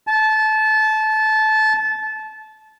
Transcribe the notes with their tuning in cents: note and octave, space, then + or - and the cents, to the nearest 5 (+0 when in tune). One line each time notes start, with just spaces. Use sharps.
A5 -20